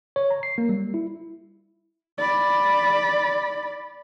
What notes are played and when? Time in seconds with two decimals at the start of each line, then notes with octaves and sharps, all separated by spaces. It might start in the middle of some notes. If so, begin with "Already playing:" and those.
0.16 C#5
0.30 A#5
0.43 C7
0.58 A#3
0.69 G3
0.94 E4
2.18 D5 B5